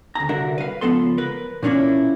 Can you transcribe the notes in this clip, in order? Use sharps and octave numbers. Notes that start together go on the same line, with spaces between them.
D2 A#5
C2 D3 F#4 A#4 E5
B4 F5
C#2 G#2 F3 B3 A4 C6
A#4 B4
A#2 E3 A#3 C#4 D4 E4